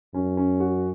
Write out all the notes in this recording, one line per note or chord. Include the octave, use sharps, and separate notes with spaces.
F#2 C#4
C#4
F#4